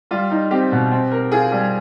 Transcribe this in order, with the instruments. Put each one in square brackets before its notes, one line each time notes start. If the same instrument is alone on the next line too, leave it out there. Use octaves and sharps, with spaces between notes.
[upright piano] G3 [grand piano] F4
[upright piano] D#4
[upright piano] C4 [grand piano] G4
[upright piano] B2
C4
A#4
[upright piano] F4 [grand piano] G#4
[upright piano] G3